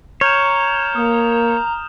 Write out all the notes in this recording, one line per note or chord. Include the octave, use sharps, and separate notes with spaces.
C#5 A#5 F6 G6 E7
A#3 D#6